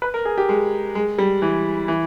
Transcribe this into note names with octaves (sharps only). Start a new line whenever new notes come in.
B4
A#4
G#4
G4
G#3
G#3
G3
E3
E3